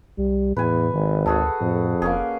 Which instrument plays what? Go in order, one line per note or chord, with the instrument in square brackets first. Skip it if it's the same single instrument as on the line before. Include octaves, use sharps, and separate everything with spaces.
[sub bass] C2 [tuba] G3
[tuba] E2 [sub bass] A2 [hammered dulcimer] B4 G#5
[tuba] G#1 [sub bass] D#3
[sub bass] D2 [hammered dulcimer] F#4 G#4 A4
[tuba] F2 [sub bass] A2
[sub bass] F1 [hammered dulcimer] A#3 C#4 G#4